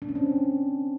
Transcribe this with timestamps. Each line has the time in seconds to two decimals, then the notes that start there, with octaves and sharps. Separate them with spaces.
0.02 D4
0.09 C#4
0.15 C4